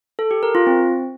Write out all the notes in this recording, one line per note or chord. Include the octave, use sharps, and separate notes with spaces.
A4
G4
A#4
F4
C4